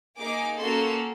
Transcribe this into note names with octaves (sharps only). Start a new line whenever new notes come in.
A#3 D#4 G#4 D6
A#3 C#4 F#4 A4 C6